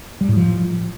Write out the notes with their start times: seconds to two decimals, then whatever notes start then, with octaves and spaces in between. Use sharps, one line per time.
0.21 G3
0.29 A2
0.36 F3